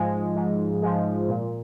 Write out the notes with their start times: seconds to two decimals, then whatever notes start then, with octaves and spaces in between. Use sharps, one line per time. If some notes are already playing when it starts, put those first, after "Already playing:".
Already playing: G#2 F3 G#3
0.35 G#2
0.82 F3 G#3
1.28 A#2